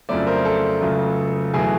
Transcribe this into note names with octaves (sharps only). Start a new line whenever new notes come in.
F2 C#3 F#3 A3 D5 E5
A#4 C5
A4
C#2 C#3 F#3 A3
E2 B2 F#3 A3 G#4